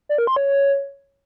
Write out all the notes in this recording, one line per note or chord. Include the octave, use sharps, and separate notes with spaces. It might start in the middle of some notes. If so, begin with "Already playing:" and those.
D5
A#4
C6
C#5